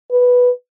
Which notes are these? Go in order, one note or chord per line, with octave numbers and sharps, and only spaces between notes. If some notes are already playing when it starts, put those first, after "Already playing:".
B4